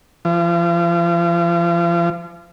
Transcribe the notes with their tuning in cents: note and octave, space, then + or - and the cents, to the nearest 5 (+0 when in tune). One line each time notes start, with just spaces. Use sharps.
F3 -40